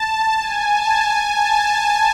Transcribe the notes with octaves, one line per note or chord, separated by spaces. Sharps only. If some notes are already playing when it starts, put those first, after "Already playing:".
Already playing: A5
G#5
A5
G#5
A5